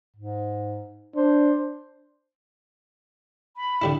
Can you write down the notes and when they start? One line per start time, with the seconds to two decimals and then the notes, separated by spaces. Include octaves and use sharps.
0.17 G#2
1.16 D4 C5
3.57 B5
3.82 D3 G3 E4